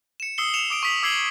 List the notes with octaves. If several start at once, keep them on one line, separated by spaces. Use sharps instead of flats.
C#7 E7
D#6 E6 C7 C#7 G7
C#7 E7 F7
D6 D#6 D7
C#6 D#6 B6 F7 F#7
D6 E6 G#6 C7 F#7 G7